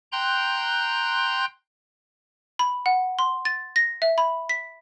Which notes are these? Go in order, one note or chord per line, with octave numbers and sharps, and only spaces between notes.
G5 A#5 C6 F#6 G6
B5
F#5
C6
A6
A#6
E5
B5
B6